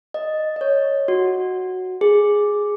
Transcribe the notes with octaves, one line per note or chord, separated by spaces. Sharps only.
D#5
D#5
C#5
F#4
G#4